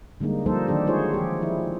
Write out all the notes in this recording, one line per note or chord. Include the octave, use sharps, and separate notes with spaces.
D3 G3 G#3 A#3 D#4
F3 G3 A#3 D#4 A4 C5
D#3 F#3 D4 G4 A4
G#3 D#4 F4 G#4 C5 C#5
F3 G4
F3 E4